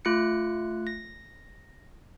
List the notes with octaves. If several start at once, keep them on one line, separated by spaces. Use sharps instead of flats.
A3 F4 F#6 A6 C#7
A#6